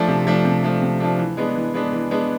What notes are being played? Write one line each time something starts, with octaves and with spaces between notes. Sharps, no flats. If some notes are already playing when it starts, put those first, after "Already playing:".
Already playing: F3 A3 D4
C3
F3 A3 D4
C3
F3 A3 D4
C3
F3 A3 D4
E3
G#3 B3 D4
E3
G#3 B3 D4
E3
G#3 B3 D4